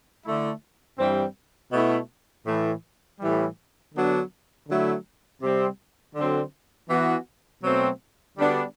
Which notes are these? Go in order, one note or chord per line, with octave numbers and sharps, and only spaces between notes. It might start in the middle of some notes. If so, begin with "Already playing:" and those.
D3 A3 E4
G2 E3 G3 C4
B2 A3 E4
A2 E3 A3
A2 E3 G3
D3 F#3 B3 D4
D3 F#3 A3 E4
C3 G3 C4
D3 F#3 C4
E3 B3 F#4
B2 F#3 A3 C4
D3 G3 B3 D4 F#4